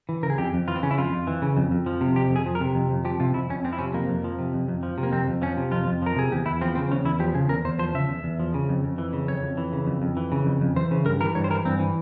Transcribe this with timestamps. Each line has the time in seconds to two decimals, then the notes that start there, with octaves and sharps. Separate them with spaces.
0.09 E3
0.23 C#3 A#4
0.30 G#4
0.38 F2 G4
0.54 F2
0.68 E3 F4
0.76 C4
0.83 C#3 C#4
0.91 E4
0.98 F2 F4
1.12 F2
1.27 E3
1.42 C#3
1.57 F2
1.71 F2
1.86 F3
2.01 C3
2.16 F2 G4
2.30 F2
2.36 G#4
2.46 F3
2.55 A#4
2.61 C3
2.75 F2
2.90 F2
3.05 F3 G4
3.20 C3 F4
3.34 F2 E4
3.50 F2 C#4
3.64 F3 C4
3.73 E4
3.79 C3 C#4
3.93 F2 A#3
4.09 F2
4.24 F3
4.39 C3
4.53 F2
4.68 F2
4.83 F3
4.98 C3
5.03 A#3
5.12 F2 C4
5.28 F2
5.42 F3 C#4
5.57 C3
5.72 F2 F4
5.87 F2
6.02 F3 A#4
6.16 C3 G#4
6.32 E2 G4
6.46 E2 E4
6.61 F3 C4
6.75 C#3 C4
6.91 E2 C#4
7.05 E2 E4
7.20 F3 G4
7.34 C#3 G#4
7.49 E2 A#4
7.65 E2 C5
7.79 F3 C5
7.95 C#3 E5
8.09 E2
8.24 E2
8.40 F3
8.54 C#3
8.69 F2
8.84 F2
8.98 E3
9.13 C#3
9.28 F2 C#5
9.43 F2
9.57 E3
9.73 C#3
9.87 F2
10.02 F2
10.17 E3
10.32 C#3
10.46 F2
10.61 F2
10.76 E3 C5
10.91 C#3
11.05 G2 A#4
11.21 E3 A#4
11.35 G2 C#5
11.44 C5
11.50 E3 A#4
11.65 G2 C4
11.79 E3